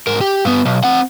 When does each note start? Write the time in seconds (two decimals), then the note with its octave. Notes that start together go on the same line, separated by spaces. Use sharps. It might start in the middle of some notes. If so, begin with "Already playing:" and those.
0.07 G#2 A#4
0.21 G4
0.45 G2 B3
0.66 B1
0.84 C4 F#5